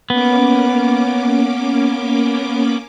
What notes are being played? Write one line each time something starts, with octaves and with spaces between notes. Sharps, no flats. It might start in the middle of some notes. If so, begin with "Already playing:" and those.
A#3 B3 C#4 D6